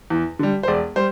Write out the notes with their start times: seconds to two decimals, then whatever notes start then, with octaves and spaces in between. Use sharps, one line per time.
0.10 E2
0.39 D3 G3
0.63 C5
0.68 E1 D5
0.96 G3 C5